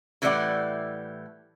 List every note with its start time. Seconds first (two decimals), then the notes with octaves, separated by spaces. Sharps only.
0.22 A2 E3 G3 A3 D5 F#5